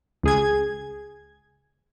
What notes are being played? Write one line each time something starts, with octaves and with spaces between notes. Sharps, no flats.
C#2 G#4 G#6